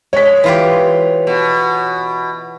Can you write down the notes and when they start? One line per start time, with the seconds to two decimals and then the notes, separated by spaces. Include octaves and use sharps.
0.13 G#3 C#5 B6
0.44 E3 F4 G4
1.27 B2